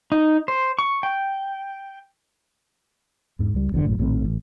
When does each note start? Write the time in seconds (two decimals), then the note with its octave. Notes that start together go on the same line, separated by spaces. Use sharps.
0.12 D#4
0.48 C5
0.79 C#6
1.03 G5
3.39 E2 G#2
3.54 C#2 G3
3.72 F#1 E2 A2 D3
3.85 A#1 F#2 A2
3.99 A#1 A2 D#3 C4
4.25 A1